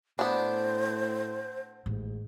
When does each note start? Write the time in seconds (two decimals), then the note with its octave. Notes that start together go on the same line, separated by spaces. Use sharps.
0.19 A2 B3 D4 C5
1.86 A1 G#2